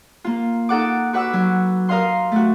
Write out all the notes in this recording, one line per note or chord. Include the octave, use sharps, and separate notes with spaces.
A#3 F4
D#4 A4 F#5 D6
F#4 B4 F#5 D6 E6
F#3
A#4 D#5 F5 C6
A3 F#4